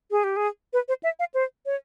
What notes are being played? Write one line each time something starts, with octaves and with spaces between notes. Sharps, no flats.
G#4
G4
G#4
B4
C5
E5
F5
C5
C#5